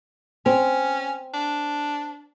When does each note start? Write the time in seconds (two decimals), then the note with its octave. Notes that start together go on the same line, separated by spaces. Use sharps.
0.46 C4 C#4
1.34 D4